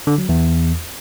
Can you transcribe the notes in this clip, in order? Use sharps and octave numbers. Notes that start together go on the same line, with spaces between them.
D3
F#3
E2